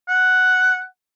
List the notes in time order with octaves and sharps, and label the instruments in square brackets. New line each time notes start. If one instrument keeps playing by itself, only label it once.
[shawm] F#5